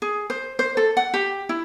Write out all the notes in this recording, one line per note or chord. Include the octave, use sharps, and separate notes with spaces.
G#4
C5
C5
A4
F#5
G4
E4